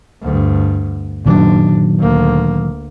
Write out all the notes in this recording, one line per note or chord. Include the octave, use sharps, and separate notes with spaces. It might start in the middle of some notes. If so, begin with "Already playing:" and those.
D2 G2
F#1 A#2 D#3 F#3 D4
D2 A#3